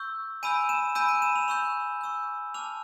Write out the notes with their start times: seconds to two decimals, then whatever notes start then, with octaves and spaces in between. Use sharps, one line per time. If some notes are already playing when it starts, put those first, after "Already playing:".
Already playing: C#6 E6 G6
0.43 G#5 B5 E6 G6 D#7
0.69 E7
0.95 G#5 B5 E6 G6 D#7
1.09 D#7
1.22 E7
1.36 F7
1.48 C#6 E6 G6 F7
2.01 C#6 E6 G6
2.54 A5 D6 F6 F7